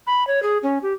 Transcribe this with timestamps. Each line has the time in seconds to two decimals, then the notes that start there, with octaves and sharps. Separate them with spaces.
0.07 B5
0.27 C#5
0.43 G#4
0.63 C#4
0.83 G4